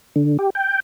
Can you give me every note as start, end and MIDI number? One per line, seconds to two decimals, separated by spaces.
0.16 0.37 50
0.39 0.50 67
0.55 0.80 79